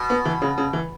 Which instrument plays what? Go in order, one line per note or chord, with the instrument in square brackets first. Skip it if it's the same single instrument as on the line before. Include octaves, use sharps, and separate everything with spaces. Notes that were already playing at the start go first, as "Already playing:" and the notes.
Already playing: [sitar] B2
[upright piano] B3
E3
C#3
C#3
E3